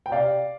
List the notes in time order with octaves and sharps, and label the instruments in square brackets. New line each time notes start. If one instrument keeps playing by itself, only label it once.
[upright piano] G5
C3 D5 F5